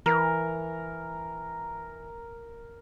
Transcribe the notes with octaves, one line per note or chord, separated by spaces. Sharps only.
E3 A#4